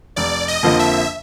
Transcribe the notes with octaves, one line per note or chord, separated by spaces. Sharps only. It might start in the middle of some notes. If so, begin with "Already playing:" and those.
F1 D5
D#5
F2 D3 F3 A#3
E5